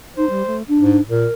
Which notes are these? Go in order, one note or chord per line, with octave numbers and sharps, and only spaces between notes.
D#4 C5
G3
A3
D4
G#2
A#2 A#4